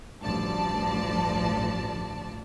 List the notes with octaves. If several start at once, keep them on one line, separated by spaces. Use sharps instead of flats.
A1 D2 G2 F3 D5 A5